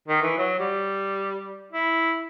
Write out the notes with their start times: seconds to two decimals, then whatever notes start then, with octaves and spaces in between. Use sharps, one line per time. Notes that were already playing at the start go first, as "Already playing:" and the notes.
0.08 D#3
0.22 E3
0.38 F#3
0.60 G3
1.72 E4